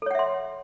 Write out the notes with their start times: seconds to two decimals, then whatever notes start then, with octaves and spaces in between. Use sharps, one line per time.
0.02 A4
0.06 C#5
0.11 F#5
0.15 E5
0.19 C6